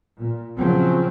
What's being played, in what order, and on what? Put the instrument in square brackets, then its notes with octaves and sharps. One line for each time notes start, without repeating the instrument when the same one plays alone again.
[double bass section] A#2
C#3 F3 F#3 C4 C#4